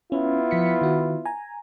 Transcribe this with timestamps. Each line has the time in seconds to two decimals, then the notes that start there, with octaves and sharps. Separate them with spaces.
0.12 B3 C#4 E4 F4
0.51 F3 B6 C#7
0.82 D#3 F#4
1.25 G#5 A#5